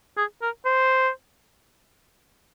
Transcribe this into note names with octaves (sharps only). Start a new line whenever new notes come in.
G#4
A#4
C5